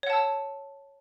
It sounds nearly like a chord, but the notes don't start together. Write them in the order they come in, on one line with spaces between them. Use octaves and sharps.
C#5 F#5 A5 E6